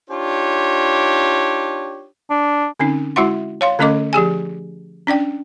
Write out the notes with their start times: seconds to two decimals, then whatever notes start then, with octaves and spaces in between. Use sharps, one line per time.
0.10 D4 D#4 F4 G4 C#5
2.30 D4
2.79 D3 C4 C#4 D#4
3.16 G#3 E4 F#4 E5 F#5 C6
3.61 C#5 F5 C6
3.79 D3 A3 C#4 A4 D#5 D6
4.13 F3 G4 G#4 G#5
5.07 C#4 D4 D5 G5